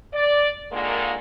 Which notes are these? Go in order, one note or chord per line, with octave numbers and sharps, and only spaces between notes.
D5
A#2 D3 D#3 G#3 A#3